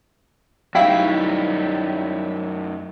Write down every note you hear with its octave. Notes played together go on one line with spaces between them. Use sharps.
F#2 G3 D#4 E4 F#4 F5 G5 B6